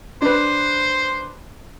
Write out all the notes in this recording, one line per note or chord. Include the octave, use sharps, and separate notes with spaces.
D4 B4 C5